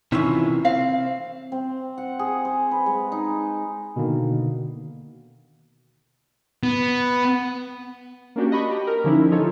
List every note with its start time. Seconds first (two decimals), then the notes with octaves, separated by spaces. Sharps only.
0.12 C3 D#3 E3 C#4 E4 F4
0.65 C4 F5
1.52 C4
1.98 F#5
2.19 G#4
2.45 C5
2.71 B4
2.86 G#3
3.12 D#4
3.96 B2 D3 D#3 A#3
6.63 B3
8.36 A#3 C#4 D4 F#4 G4
8.51 D4 D#5 B5 C#6
8.71 G4
8.87 A#4
9.04 D3 F3 C#4 D#4 E4
9.31 F3 D#4 F4 A4 C#5